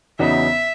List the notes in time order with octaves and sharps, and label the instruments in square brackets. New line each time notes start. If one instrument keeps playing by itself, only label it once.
[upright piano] E2 C#3 F#3 B3 D#4 [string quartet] E5